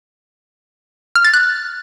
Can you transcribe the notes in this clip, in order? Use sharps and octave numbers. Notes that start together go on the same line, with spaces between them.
F6
A6
F#6